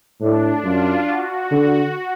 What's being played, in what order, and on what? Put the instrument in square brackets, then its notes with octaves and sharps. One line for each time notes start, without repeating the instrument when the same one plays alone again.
[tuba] A2 [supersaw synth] D4
[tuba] F#2 [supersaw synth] F4
[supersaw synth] F#4
[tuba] D3